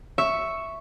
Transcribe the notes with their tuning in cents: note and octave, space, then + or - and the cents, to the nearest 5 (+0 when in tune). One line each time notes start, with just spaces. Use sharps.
E5 +0 C#6 +0